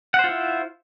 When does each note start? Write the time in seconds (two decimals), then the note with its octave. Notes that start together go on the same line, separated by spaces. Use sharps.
0.14 F#5
0.19 C5
0.24 F4
0.29 E4